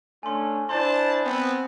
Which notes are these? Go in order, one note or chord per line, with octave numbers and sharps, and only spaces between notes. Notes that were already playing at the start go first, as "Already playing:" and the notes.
A3 C#4 D4 G#5 C6
D4 E4 C5 A5 C6
B3 C4